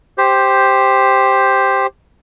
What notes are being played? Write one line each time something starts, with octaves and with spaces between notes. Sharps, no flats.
G4 C5